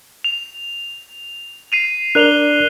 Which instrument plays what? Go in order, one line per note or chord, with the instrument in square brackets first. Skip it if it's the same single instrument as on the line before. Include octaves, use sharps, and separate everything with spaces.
[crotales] F7
C7 D#7 F7
[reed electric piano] D4 A#4 D5 [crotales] F#6 F7 G7